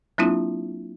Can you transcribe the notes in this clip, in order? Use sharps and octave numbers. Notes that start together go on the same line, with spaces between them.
F#3 A#3 C4 D4 E4 F4